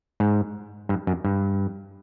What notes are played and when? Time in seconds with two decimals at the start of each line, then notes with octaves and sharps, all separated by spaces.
0.20 G#2
0.89 G2
1.07 F#2
1.25 G2